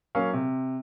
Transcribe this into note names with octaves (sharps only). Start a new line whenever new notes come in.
F#3 A#3 C#4 F5
C3